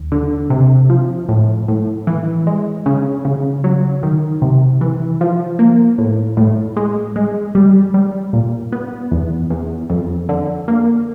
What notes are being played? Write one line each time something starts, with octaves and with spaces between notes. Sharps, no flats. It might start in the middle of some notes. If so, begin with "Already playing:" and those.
Already playing: D#2
D3
C3
F3
A2
A2
E3
G#3
C#3
C#3
F#3
D#3
C3
E3
F3
A#3
A2
A2
G#3
G#3
G3
G3
A#2
B3
E2
E2
F2
D3
A#3